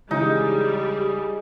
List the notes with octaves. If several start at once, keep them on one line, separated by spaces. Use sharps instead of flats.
C#3 E3 G3 G#3 D#4 G#4